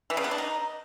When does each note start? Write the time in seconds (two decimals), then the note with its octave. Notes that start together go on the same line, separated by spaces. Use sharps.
0.10 E3
0.17 C#3
0.24 B3
0.31 D4
0.38 D#4